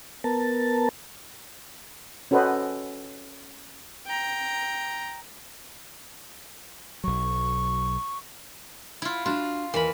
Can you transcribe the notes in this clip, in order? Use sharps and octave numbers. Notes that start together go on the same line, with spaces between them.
B3 A#4 A5
C#4 F#4 A4 B4 C5 D#5
G5 A#5
B1 F#3 C#6
E4 F4
D4 F4 F#4 A5
D#2 E3 A#4 B5